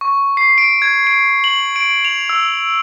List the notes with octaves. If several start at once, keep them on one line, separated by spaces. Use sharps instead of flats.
C#6
C7
D7
G#6
D7
F#7
D7
F7
E6